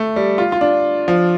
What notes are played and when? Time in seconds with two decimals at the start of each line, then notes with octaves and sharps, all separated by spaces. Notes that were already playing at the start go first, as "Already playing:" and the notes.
Already playing: A3
0.16 G3
0.38 F4
0.52 F4
0.61 D4
1.08 F3